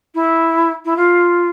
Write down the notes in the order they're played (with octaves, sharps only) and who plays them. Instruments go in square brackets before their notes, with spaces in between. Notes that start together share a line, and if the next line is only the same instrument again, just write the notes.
[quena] E4
E4
F4